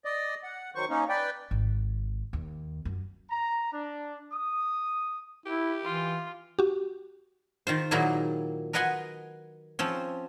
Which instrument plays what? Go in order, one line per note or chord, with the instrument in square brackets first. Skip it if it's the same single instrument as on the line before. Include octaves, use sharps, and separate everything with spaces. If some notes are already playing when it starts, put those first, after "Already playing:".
[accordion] D5 D#5
F#5
D#3 F#3 C5 C#6
A#3 C#4 D#4
B4 D5 G5
[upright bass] G#1
D#2
F#2
[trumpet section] A#5
D4
D#6
[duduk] E4 [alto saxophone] G4
[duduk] E3 [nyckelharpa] F4
[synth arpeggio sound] F#4 G4
[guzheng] D#3 F4 C5
A#2 D#3 F#3 A#3 E4 G#4
A#4 B4 D#5 F#5 G#5 C6
F3 C4 C#4